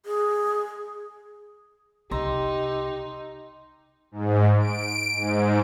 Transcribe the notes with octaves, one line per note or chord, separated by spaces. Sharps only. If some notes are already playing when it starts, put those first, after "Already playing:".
G#4
C2 D#4 G4 A#5 C6 E6
G#2
D7
G#2